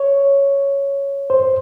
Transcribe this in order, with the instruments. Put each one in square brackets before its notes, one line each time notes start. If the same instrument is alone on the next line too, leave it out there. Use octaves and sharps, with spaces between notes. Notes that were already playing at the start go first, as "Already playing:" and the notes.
Already playing: [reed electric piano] C#5
C5